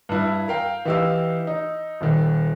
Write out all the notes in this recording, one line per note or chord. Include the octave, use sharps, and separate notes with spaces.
G2 E4
A#4 F5 G5
E3 D#4 G4 F5 E6
D#4
D#1 D#3